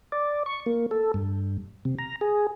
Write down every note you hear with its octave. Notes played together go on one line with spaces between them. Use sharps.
D5
C#6
A#3
A4
G2
C3
A#5
G#4